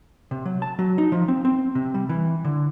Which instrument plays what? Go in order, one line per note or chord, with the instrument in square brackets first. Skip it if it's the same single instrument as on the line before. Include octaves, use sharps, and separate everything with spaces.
[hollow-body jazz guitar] C3
F#3
A5
F#3
D#4
F3
C4
C4
C3
G3
E3
D3